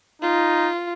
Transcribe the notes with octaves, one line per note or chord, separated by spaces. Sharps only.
D#4 F4